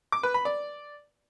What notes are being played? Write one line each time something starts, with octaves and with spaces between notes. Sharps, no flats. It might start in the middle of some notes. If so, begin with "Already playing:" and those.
D6
B4
B5
D5